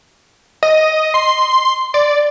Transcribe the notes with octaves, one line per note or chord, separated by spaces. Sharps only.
D#5
C6
D5